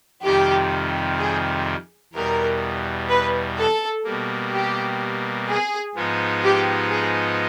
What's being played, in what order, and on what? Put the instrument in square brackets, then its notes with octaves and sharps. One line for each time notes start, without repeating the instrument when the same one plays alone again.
[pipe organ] F2 C3 D#3 G3 [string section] G4
[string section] G#4
[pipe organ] E2 B2 G3 [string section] A#4
[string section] B4
A4
[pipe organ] B2 G3 A#3
[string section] G4
G#4
[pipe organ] G#2 F3 G#3 B3 D#4
[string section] G4
G#4